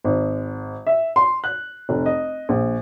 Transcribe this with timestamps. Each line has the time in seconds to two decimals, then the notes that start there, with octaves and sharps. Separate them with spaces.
0.04 G#1
0.87 E5
1.16 C6
1.44 F#6
1.89 F1
2.06 D#5
2.49 A#1